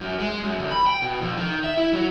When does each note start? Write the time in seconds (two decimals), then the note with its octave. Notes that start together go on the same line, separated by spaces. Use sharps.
0.01 F#2
0.20 G#3
0.43 F#2
0.59 D2
0.71 B5
0.87 G5
1.02 B2
1.22 F2
1.37 D#3
1.64 E5
1.77 E4
1.93 F#3